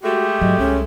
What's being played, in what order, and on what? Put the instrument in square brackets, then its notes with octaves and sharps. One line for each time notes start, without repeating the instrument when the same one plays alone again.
[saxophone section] G#3 A3 [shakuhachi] F#4 [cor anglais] G4
[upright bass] G#2 F#3 [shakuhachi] D#5
[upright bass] C2 [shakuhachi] C#4